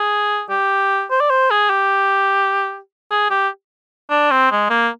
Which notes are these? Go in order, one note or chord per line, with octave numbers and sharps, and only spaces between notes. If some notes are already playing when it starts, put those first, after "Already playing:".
Already playing: G#4
G4
C5
D5
C5
G#4
G4
G#4
G4
D4
C4
G#3
A#3